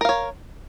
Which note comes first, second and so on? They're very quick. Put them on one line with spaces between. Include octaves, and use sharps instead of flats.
A#4 F5 C#5